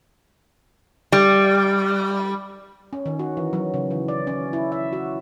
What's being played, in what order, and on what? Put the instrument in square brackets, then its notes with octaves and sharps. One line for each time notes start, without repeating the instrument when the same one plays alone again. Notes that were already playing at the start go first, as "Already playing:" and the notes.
[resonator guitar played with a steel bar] G3
[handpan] C#4
D#3
F#4
E3
F#3
C#3
E3
D5
C#4
E4
E5
F#4